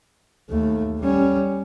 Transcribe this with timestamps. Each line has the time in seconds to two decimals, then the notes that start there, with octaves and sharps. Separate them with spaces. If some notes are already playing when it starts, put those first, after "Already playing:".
0.50 D#2 A3
0.99 G3 C#4